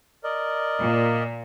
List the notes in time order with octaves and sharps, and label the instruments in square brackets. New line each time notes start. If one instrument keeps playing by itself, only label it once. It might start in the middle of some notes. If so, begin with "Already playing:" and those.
[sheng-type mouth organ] A#4 D5 D#5
[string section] A#2